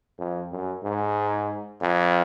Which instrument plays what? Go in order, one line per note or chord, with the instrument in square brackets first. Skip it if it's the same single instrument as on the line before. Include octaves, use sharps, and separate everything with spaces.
[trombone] F2
F#2
G#2
F2